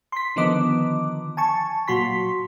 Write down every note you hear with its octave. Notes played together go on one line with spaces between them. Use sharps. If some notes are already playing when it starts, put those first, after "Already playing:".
C6 B6
D3 D#3 F3 B3 D#5 D6
G#5 A5 C#6
A#2 F#3 F#4 C6 B6